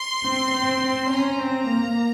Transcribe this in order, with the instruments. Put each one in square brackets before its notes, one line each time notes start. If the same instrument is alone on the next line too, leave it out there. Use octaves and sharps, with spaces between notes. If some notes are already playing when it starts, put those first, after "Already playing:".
Already playing: [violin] C6
[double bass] C4
C4
C4
[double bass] C#4 [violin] A#5
[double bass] C4
A#3